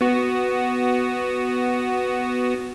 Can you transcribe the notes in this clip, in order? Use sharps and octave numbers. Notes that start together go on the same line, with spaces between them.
B3 F#4